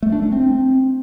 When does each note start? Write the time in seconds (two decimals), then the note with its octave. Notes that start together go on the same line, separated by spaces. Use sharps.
0.02 A3
0.12 D4
0.22 A3
0.32 C4